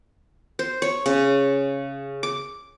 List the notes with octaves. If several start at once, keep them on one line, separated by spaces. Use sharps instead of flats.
C5
C#5
C#3
D6